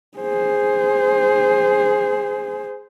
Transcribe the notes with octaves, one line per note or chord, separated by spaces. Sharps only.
G#4 C5